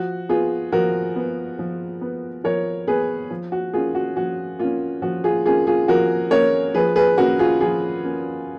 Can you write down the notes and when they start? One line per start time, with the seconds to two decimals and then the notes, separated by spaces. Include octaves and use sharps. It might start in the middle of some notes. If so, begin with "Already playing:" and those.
Already playing: F3 F#4
0.29 B3 F4 G#4
0.72 F3 F#4 A#4
1.16 B3
1.59 F3
2.01 B3
2.44 F3 A#4 C#5
2.87 B3 G#4 B4
3.31 F3
3.52 F#4
3.73 A#3 C#4 F4 G#4
3.95 F#4
4.16 F3 F#4
4.59 A#3 C#4 F4
5.02 F3 F#4
5.24 F4 G#4
5.45 A#3 C#4 F4 G#4
5.67 F4 G#4
5.88 F3 F#4 A#4
6.31 A#3 C#4 A#4 C#5
6.75 F3 G#4 B4
6.96 G#4 B4
7.17 A#3 C#4 F#4 A#4
7.39 F4 G#4
7.61 F3 F4 G#4
8.04 A#3 C#4